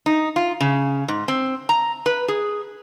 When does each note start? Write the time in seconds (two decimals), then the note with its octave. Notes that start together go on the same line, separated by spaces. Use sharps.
0.06 D#4
0.36 F4
0.61 C#3
1.08 G#2
1.28 C4
1.69 A#5
2.06 B4
2.28 G#4